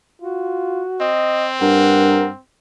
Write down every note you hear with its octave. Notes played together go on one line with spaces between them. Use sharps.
F4 F#4
C4 D#5
G2 A#4 F#5